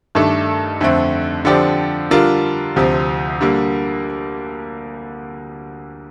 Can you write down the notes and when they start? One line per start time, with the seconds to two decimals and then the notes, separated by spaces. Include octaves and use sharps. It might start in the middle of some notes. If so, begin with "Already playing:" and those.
0.15 G2 D#3 A3 D4 A4
0.81 F2 D3 A3 C4
1.45 D3 F3 C4 G4 D5
2.11 D3 G3 D4 F4 A#4
2.76 D2 C3 F3 C4
3.41 D3 G3 A#3